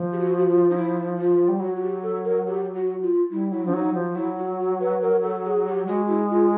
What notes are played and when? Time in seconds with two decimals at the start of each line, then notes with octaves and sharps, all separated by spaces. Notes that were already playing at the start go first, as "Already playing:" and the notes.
Already playing: F3
0.12 G4
0.18 F#4
0.37 F#4
0.46 F4
0.70 D#4
0.75 E4
1.17 F4
1.48 G3
1.60 F#3 F#4
1.76 F#4
1.82 G4
2.02 A4
2.24 A#4
2.46 G4
2.74 F#4
3.01 F4
3.30 G3 E4
3.51 F#3 E4
3.65 F3 D4
3.73 F#3 D#4
3.94 F3
4.15 F#3 E4
4.38 F#4
4.58 F#4
4.80 B4
5.01 A#4
5.22 A4
5.44 G#4
5.65 G4
5.86 G#3 F#4
6.08 E4
6.29 F4